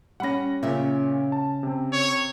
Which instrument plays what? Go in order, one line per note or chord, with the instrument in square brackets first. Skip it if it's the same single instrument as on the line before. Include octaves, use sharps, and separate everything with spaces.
[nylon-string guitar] G3 C#4 [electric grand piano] F#5 B5 A#6
[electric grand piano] A#2 [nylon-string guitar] C#3 C#4 E5
[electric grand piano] A5
C3 C4
[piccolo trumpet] C#5